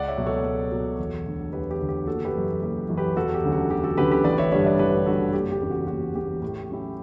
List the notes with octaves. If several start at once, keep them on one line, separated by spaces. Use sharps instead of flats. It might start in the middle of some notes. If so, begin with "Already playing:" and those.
Already playing: C#2 D5 F#5
C#5 E5
B2 F#3
A4 C#5
C#2
B2 F#3
E1
D2 D3
E1 G4 B4
G4
D2 D3
G4
F#1 F#4 A4
G4 B4
F#2 E3
F#1 G4
F#2 E3
G4 B4
E1 F#4 A4
G4
D2 D3 F#3 C#4
F#4
E1 G4
F#4 A4
D2 D3 F#3 C#4 G4 B4
G4 B4
A1 B4 D5
C#5 E5
G2 D3 G3 D4 C#5 E5
B4 D5
A1 G4 B4
G2 D3 G3 D4 F#4 A4
F#4
F#1 G4
G4
E2 C#3
F#4
F#1 F#4
E2 C#3 G4
A2
F#3 C#4 E4